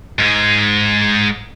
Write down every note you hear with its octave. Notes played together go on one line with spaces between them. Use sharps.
G#2 G#3